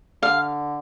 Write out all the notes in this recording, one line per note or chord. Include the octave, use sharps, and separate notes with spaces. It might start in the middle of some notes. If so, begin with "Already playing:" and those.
D3 F5